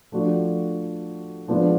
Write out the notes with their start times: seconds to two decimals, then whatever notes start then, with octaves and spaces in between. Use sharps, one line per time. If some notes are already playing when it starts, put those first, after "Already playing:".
0.12 F3 A3 D4 F#4
1.48 F3 G#3 B3 D4